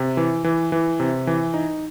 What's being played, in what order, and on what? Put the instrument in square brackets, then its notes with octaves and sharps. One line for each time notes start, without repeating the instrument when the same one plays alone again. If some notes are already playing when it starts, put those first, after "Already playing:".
Already playing: [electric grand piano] C3
E3
E3
E3
C3
E3
D#4